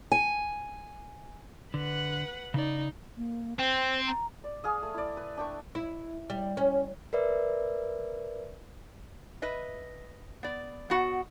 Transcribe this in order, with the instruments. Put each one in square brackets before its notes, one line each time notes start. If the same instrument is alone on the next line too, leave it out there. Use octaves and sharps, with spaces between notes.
[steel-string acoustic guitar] G#5
[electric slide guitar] D3 [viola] B4 F#5
[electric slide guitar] C#3 D5 [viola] D#4
[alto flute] A#3
[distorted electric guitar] C4 [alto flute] C5
[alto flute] A#5
[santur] D5
G#4 F5 D#6
A3
E4 D5
B4
D4 G5 A5 C#6
[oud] E4
G3
C#4
[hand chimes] A#4 B4 D5 E5
[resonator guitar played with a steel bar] B4 D#5 E5
B3 D5
B3 F#4 F#5